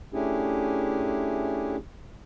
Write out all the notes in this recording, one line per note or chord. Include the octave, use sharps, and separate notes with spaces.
A3 C#4 D4 E4 G4 G#4